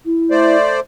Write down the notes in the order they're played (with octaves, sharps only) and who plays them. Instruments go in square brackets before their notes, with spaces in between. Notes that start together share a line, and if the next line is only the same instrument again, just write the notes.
[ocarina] E4
[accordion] A3 C5 D5